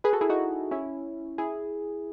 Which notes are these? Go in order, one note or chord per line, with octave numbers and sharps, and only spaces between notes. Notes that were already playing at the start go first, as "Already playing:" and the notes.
G#4 B4
F#4 A4
E4 G#4
D#4 F#4
C#4 E4
E4 G#4